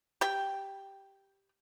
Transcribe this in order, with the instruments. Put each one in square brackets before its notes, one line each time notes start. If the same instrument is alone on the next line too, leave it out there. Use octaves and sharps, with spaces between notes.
[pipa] G4 G5